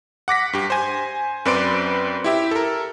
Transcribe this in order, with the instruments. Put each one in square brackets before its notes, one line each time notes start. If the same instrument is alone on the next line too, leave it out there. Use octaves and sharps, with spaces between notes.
[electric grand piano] F#5 D6 A#6 B6
G2 G4
C5 G#5
F#2 C4 B4 D5 C6 D7
E4 G4 E5
A4 A#4